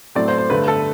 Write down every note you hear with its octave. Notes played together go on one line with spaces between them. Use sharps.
A2 F#3 A3 C4 D5
C5
C5
G2 D3 A3 B4
A4